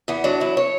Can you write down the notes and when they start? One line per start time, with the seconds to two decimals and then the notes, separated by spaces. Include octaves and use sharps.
0.08 E2 B3
0.24 F#3 D4
0.40 E2 E4
0.57 C#5